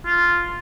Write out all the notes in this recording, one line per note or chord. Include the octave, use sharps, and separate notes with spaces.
F4